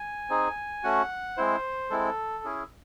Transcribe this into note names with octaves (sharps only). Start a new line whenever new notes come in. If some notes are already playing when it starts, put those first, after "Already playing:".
Already playing: G#5
C4 D#4 G#4
A3 C#4 F#4 F#5
G#3 C4 E4 C5
G#3 C4 E4 A4
C#4 E4 G#4